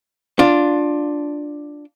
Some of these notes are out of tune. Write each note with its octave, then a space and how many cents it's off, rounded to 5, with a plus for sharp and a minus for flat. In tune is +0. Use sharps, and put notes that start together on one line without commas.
D4 +0 F4 +10